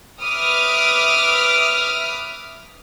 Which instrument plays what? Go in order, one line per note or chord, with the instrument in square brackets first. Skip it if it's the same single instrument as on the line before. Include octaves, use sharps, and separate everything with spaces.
[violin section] B4 E5 D6 D#6 F6